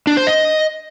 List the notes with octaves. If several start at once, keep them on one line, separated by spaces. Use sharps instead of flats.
D4
C5
D#5